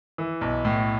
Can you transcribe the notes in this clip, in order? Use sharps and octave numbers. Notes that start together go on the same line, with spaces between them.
E3
B1
A2